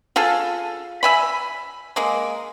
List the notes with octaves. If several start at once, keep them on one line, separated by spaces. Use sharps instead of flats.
F4 G#4 A4
E5 G#5 B5
G#3 A#3